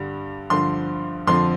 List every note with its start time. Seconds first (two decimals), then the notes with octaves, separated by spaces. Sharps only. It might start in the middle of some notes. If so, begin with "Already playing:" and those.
Already playing: G2 D3 G3
0.50 G2 D3 F3 C6
1.27 F2 D3 F3 C6